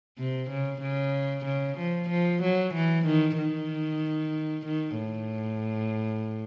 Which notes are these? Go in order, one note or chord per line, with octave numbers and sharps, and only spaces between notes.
C3
C#3
C#3
C#3
F3
F3
F#3
E3
D#3
D#3
D#3
A2